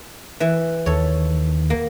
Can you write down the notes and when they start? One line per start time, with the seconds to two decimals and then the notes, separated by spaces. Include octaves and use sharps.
0.40 E3 E5
0.86 D#2 A4 C#5
1.70 A#3